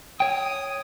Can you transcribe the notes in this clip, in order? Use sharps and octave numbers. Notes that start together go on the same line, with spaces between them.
C#5 G5 D#6